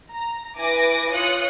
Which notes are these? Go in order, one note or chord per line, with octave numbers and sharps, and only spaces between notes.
A#5
E4 B4 G#5 D6 A#6
F4 C#5 D#6 F#6 C#7